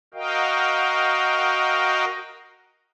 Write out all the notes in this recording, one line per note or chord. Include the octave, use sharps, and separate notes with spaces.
F#4 A#4 D#5 F5 G5